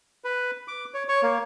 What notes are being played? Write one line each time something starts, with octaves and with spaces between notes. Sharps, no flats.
B4
D6
C#5
C#5
A#3